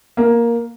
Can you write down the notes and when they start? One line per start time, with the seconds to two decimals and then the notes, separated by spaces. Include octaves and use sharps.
0.17 A#3